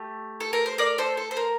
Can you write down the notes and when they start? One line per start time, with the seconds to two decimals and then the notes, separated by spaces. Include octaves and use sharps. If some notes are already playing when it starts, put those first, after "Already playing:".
Already playing: A3 G4
0.40 A4
0.53 A#4
0.66 C5
0.78 A#4 D5
0.98 A4 C5
1.17 A4
1.31 C5
1.37 A#4